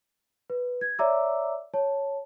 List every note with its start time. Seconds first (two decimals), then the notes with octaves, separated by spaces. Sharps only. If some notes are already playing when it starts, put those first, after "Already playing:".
0.50 B4
0.81 G#6
0.99 C#5 D5 E5 A#5 D6 E6
1.74 C#5 A5